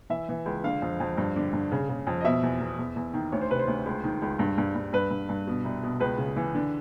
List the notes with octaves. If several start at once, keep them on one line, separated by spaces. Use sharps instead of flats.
E3 E5
E3
C#2
D3 F5
F2
F2
G2
D3
G2
C#3
C#3
F2
D#5
B2 E5
E2
E2
E2
E2
D#3
D2 C#5
C5
C3 B4
C5
D2
C#2
D#3
C#2
G2
G2
G2
G2 B4
G2
G2
B2
C2
B2
C#2 B4
C#3
E3
D3